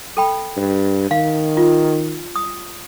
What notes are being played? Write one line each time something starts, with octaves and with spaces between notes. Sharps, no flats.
A4 G5 B5
G2
D#3 F5
F4
D#6